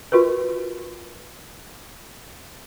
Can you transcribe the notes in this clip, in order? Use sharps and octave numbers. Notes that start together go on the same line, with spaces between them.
F4 F#4 A#4 B4